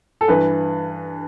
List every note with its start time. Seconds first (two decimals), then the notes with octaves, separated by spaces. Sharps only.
0.21 A4
0.28 G2 E3 B4